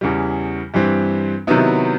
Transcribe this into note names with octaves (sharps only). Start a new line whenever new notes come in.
E2 C#3 E3 G3
G2 E3 G3 C4
C3 D#3 F#3 B3 E4